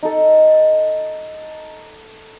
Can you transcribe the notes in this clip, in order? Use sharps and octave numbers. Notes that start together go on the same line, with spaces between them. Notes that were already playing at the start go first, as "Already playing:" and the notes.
D#4 A4